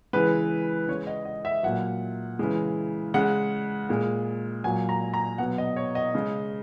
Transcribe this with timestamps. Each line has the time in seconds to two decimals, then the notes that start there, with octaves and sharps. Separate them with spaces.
0.13 C#3 E3 G#3 B4
0.88 C#3 G#3 C#5
1.07 D#5
1.25 D#5
1.45 E5
1.63 A#2 F#3 F#5
2.39 C#3 E3 G#3
3.14 C#3 G#3 F#5
3.89 A#2 G#3
4.64 A#2 F#3 G#5
4.89 A#5
5.14 A#5
5.38 B2 F#3 F#5
5.58 D#5
5.76 C#5
5.95 D#5
6.15 C#3 G#3